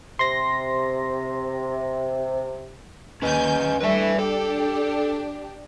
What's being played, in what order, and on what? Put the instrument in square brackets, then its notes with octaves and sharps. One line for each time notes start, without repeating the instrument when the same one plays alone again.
[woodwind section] C3 [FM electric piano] C6 A#6
[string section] D#2 G#5 G6 [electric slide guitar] C#4 B4 D#5
[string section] G3 A3 D4 [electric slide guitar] B4 E5
[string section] D4 G4 [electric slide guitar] A4